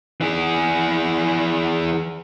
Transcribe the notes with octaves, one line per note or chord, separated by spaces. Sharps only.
E3 G#4